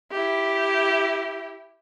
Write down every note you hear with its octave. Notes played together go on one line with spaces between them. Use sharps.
E4 G4